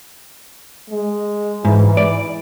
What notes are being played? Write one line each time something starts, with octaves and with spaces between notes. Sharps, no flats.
G#3
G#2 E3
D5